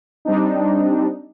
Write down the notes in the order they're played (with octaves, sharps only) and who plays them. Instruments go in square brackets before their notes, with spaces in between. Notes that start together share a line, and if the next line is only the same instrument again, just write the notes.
[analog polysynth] G3 C4 D4 D#4